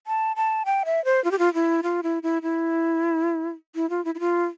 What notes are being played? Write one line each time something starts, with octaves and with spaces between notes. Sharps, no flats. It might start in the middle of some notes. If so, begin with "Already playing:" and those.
A5
A5
G5
E5
C5
F4
G4
F4
E4
F4
E4
E4
E4
E4
F4
E4
E4
F4